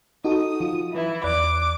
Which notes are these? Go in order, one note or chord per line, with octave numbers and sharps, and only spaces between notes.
D#4 F#4 A4 D#6
F3 F4
E3 E4
E2 D5 D6 F#6